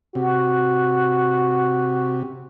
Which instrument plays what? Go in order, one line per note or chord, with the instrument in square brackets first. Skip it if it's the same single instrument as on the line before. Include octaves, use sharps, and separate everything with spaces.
[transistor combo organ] C3 [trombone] F#4